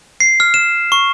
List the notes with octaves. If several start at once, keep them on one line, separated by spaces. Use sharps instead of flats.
C7
F6
E7
C#6